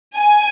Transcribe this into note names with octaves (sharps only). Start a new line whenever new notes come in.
G#5